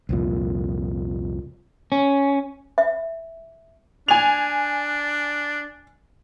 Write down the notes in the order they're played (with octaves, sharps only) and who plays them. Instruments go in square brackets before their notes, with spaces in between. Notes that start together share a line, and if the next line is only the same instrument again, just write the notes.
[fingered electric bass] C2 F2 A#2
[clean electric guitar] C#4
[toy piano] E5
[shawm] D4 [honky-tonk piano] G#5 F7